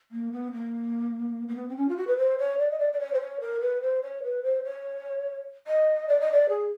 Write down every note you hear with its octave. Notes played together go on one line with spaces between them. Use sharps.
A#3
B3
A#3
A#3
B3
C4
C#4
F4
F#4
B4
C5
C#5
D5
D#5
D5
D5
C#5
C5
C#5
A#4
B4
C5
C#5
B4
C5
C#5
D#5
D5
D#5
D5
G#4